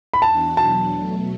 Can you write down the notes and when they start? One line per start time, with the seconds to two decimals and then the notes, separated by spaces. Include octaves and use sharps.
0.14 B5
0.22 E2 E3 D4 F#4 A5
0.57 E2 B2 F#3 D4 A5
0.93 B2 F#3 A3